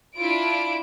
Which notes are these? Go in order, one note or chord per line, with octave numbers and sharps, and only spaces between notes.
D4 E4 F4 D7